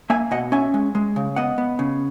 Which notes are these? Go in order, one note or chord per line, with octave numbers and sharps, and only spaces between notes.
A#3 E5 G#5
B2 D#5 F#5
C#4 E5 G#5
G#3
G#3
C#3
B3 D#5 F#5
B3
C#3